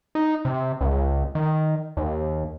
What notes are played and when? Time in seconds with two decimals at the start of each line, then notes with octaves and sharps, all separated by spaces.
0.15 D#4
0.45 C3
0.81 C#2
1.35 D#3
1.97 D#2